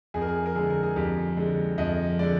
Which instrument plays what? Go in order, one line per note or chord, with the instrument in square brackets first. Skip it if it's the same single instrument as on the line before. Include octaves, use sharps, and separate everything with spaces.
[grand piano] F2 G#4
A#4
G#4
A#4
D3 G#3 G#4
A#4
G#4
F2 G4
D3 G#3
F2 D#5
G#3 D5
D3